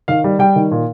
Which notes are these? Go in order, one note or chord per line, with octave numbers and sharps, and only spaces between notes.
D#3 F5
G3
G3 G5
D#3
A#2